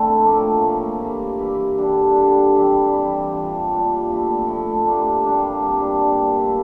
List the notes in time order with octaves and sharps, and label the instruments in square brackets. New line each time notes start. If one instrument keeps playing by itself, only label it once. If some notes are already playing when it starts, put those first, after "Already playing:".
Already playing: [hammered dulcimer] D3 A3 C4 E4
A2 F3 A#3 F4
A2 F3 A#3 F4
G2 E3 A#3 E4
G2 E3 A#3 E4
D3 G3 D4
D3 G3 D4
E3 G3 C4 G4
E3 G3 C4 G4
A#2 G3 D4 F4
A#2 G3 D4 F4
F3 A3 E4
F3 A3 E4
G3 A#3 D4 F4
G3 A#3 D4 F4
C3 G3 A#3 D4
C3 G3 A#3 D4
A3 E4 A4